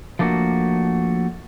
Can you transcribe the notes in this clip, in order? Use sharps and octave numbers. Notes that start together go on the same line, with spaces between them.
F3 A3 A#3 D4 F#4